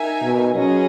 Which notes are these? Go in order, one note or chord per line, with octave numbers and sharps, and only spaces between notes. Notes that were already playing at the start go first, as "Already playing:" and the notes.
Already playing: D#4 A#4 E5 G#5
B2
F#3 C#4 G#4 B4 D#5